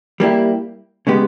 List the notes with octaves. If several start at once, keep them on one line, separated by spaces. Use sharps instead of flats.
G3 A#3 E4 G4
C#3 G#3 B3 G4